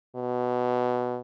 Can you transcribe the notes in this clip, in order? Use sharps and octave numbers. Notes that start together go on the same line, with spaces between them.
B2